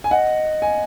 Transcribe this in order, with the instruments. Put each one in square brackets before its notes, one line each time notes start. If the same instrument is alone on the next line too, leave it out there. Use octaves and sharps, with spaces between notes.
[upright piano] G#5
[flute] D#5 [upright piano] F#5
[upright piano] G#5